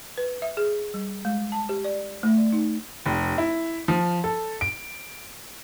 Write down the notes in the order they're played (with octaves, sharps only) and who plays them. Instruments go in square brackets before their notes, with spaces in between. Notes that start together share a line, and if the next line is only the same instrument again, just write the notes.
[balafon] B4
E5
G#4
G3
G#3
A5
G4
D5
A3
D5
D#4
[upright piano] F1
E4
F3
A4
D7